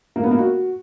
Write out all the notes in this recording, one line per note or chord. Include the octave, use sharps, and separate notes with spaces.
A#3
B3
A#3
F#4